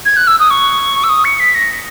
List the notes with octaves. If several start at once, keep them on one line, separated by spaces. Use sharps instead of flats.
G#6
F#6
E6
D#6
C#6
E6
D#6
C#7
B6
A#6